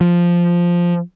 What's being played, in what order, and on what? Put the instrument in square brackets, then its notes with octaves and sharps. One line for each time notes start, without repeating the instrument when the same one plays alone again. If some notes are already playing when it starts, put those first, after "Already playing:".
[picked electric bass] F3